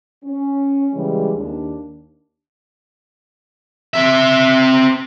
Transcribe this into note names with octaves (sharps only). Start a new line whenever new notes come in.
C#4
C#3 E3 G3 G#3
D#2 D4
C4 E5